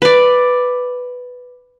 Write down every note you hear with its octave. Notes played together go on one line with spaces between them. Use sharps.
B4 D5